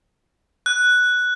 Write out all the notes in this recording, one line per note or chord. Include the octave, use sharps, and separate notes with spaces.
F#6